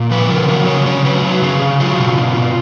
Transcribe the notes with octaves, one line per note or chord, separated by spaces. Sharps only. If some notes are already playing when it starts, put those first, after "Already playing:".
Already playing: A#2
F3 B4
C#3 A#4
F#3 A#4
C#3 C#5
C#3 C#5
F#3 B4
F#3
C#3 G#4
C#3
F#3 F4
B2
B2
B2